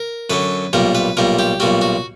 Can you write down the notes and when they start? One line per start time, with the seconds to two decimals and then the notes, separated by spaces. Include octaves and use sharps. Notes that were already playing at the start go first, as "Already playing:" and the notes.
Already playing: A#4
0.30 F#2 D3 F#3 B4
0.73 B1 A#2 G3 A#4
0.95 B4
1.17 B1 A#2 G3 A#4
1.39 G4
1.60 B1 A#2 G3 F#4
1.81 F#4